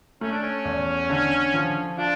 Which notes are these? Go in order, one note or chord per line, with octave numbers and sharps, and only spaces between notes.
A3 C#4
D4
C#4
E2
D3
F3
D4 F4